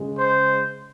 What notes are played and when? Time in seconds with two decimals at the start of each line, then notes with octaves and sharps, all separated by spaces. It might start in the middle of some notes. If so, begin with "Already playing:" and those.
Already playing: C#3 G#3
0.16 C5